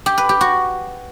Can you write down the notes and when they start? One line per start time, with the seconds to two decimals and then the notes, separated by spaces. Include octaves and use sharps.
0.06 G4
0.18 B4
0.29 G4
0.41 F#4